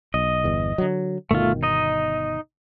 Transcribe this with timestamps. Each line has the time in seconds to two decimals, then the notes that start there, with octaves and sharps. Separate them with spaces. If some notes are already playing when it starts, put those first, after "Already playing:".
0.14 B1 D#5
0.44 G1 E2
0.78 D3 F#3
1.31 G1 B2 D#3 A3 F4
1.63 D#4 D#5